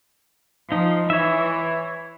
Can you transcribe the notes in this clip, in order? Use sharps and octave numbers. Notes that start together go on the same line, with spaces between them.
F3 D#4
E3 C#5 E5